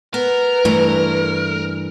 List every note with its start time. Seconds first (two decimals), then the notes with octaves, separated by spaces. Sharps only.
0.14 B3 A#4 B4
0.65 G2 E3 A3